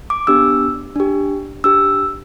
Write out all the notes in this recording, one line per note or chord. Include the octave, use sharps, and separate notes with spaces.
D6
B3 D4 G4 E6
D4 G4
D4 G4 E6